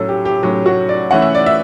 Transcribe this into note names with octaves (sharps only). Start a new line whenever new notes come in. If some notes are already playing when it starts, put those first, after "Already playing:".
Already playing: A2 F#3 C#4 A4
G4
G4
A2 F#3 C#4
F#4
D5
E3 A3 C#4 F#5
E5
D5
E5